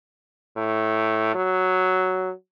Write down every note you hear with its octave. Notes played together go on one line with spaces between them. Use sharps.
A2
F#3